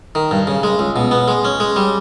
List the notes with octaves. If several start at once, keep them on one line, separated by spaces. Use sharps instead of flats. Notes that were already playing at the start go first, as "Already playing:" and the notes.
D#3
G2
C#3
G#3
C#2
B2
B3
G#3
C#4
G#3
G3